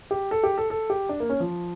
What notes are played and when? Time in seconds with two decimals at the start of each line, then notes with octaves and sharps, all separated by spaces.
0.11 G4
0.31 A4
0.43 G4
0.58 A4
0.70 A4
0.90 G4
1.09 D4
1.20 A#3
1.29 C#4
1.40 F3